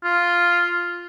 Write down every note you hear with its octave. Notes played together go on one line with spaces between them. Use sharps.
F4